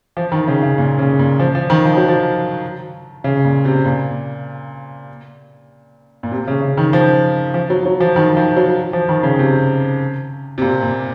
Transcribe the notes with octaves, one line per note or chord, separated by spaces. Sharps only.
F3
D#3
C#3
C#3
A#2
C#3
A#2
F3
F3
D#3
F3
F#3
F3
C#3
A#2
C3
A#2
A#2
C3
C#3
C#3
D#3
F3
F3
F#3
F#3
F3
D#3
F3
F#3
F3
D#3
C#3
C3
C3
A#2
A#2